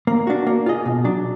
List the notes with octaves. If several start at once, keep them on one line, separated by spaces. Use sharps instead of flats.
A#3
D4 F#4
A#3
F4 G#4 D#5
B2
F#3 D4